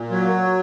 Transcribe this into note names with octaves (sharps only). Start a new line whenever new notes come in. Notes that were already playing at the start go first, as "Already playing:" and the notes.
Already playing: A#2
F#3